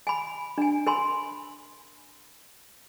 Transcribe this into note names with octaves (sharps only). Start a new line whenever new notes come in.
G#5 B5
D4 G#5
A#4 G#5 B5 C6